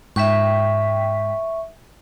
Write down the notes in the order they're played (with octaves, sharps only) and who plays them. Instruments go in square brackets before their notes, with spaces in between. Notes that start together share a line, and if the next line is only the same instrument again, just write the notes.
[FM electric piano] G#2 G5 B6 [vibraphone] E5 C#6